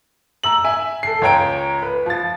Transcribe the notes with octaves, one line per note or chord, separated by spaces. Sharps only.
A#5 E6 F#7
E5 G#5
A4 C7
C#2 C#5 G5 A#5 D7
B4
F3 A6